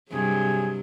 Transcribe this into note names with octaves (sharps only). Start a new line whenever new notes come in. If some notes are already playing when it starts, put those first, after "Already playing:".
G2 C3 F#3 G#4